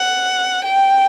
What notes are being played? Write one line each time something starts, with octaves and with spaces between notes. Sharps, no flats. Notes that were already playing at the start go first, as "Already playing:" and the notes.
Already playing: F#5
G5